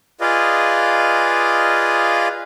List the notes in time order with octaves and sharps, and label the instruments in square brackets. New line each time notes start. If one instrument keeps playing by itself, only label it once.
[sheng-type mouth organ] F4 G#4 B4 D5 D#5 F5